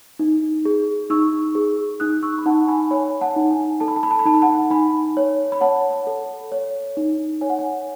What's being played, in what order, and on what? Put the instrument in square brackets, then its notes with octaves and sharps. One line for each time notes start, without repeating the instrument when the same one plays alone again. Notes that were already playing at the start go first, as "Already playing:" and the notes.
[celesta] D#4
G#4
D#4 C#6 E6
G#4
D#4 D#6 F#6
C#6 E6
B5
D#4 F#5 A5
G#5 B5
C#5 G#5 B5
F#5 A5
D#4
G#5
A4 A5
B5
A5
B5
A5
B5
D#4 A5
B5
F#5 A5
D#4 G#5 B5
C#5
B5
C#5 F#5 A5
A4
C#5
D#4
C#5 G#5
F#5
G#5